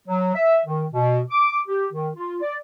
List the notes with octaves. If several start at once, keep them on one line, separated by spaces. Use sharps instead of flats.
F#3
E5
D#3
B2
D6
G4
D#3
F4
D5